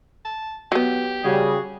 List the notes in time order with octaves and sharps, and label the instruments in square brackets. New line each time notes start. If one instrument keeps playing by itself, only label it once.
[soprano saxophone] A5
[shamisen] F#3 B3 [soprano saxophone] G4
[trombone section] C#3 G3 [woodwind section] F#4 G#4